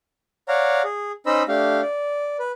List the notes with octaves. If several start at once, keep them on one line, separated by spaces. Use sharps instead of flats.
C#5 D5 F5 F#5 A#5
G#4
C#4 D#4 C5 D#5 B5 E6
A3 D4 G4 F5
D5
B4